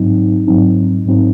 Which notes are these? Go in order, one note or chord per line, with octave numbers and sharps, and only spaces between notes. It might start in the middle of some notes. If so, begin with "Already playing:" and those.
Already playing: G#2 F#3 C4 D#4
G#2 F#3 C4 D#4
G#2 F#3 C4 D#4